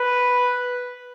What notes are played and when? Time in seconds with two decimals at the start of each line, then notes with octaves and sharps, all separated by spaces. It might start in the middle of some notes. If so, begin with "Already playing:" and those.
Already playing: B4